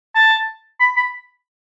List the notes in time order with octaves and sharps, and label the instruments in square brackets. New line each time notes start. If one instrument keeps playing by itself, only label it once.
[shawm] A5
B5
B5